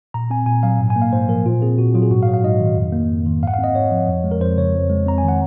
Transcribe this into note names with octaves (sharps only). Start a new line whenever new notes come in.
A#2 A#5
C4 G#5
A#2 G#5
F#3 F5
G#2
G#5
A#3
F5
G#2 C5
F3 A#4
A#2 F4
C4 G#4
A#2 F#4
F#3 F4
G#4
G#2 F#4
F5
F#3
F5
G#2 D#5
D#3
F2
A#3
F2
D#3
G#2 F5
F#5
C4 F5
D#5
G#2 C#5
F3
F2
G#3
A#4
F2 C5
C#3 C#5
F2
G#3
C4 A#5
G#5
D#3 F#5